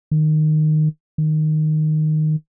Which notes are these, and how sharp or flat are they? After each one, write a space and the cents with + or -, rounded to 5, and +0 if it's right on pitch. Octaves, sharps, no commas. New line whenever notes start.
D#3 -15
D#3 -10